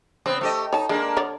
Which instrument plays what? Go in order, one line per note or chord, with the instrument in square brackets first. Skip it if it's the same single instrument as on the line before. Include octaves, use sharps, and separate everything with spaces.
[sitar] C#3 B3 C4 [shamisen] C5
[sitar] A3 G4 D#5
[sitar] D#4 [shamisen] C#5 A5
[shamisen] G#3 [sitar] A#3 D4
[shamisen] D3 C#5 D5